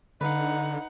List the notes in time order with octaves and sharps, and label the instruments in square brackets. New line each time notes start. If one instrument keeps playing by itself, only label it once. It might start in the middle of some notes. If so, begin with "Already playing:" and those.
[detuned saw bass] D3 [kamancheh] D#4 F#5 [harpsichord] B4 F5